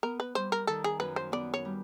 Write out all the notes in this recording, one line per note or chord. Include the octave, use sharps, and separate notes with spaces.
B3 A#4
B4
G3 C5
A#4
D#3 A4
G#4
F#2 B4
C5
B3 D5
C#5
G3